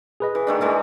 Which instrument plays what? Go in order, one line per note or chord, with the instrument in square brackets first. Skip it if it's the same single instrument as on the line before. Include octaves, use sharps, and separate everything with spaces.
[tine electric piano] G#4 B4 D#5
[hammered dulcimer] E3
D#3 A3 D4
E3 G#3 A3